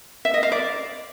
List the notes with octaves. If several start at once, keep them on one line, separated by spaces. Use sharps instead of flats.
E5
D#5
F5
D5